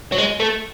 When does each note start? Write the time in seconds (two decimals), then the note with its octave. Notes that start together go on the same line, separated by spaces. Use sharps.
0.12 F#3
0.18 G#3
0.40 A3